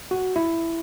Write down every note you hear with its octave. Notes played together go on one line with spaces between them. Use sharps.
F#4
E4